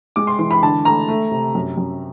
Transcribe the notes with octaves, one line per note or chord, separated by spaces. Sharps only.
G#3 D6
C6
E3 C6
B5
D3 A5
A3 A#5
A3
C3
F#2
F#2